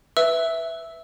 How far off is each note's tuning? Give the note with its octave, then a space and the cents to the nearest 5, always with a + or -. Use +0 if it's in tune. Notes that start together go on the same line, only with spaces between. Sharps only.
B4 +0 E5 +0 E6 -10